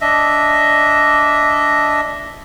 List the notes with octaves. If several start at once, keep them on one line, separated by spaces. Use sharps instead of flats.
D4 D#5 E5